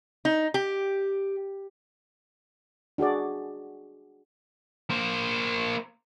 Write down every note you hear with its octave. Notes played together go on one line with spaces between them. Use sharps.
D#4
G4
D4 F#4 G#4 D5
A#3 C5